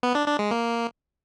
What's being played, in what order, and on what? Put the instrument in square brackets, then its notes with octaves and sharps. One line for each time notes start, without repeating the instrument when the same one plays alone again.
[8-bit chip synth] B3
D4
D4
G#3
A#3